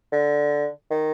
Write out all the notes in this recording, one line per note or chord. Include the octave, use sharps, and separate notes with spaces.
D3
D#3